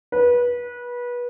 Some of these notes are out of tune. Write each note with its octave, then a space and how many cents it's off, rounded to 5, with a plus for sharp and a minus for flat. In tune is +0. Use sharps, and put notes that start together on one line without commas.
B4 -25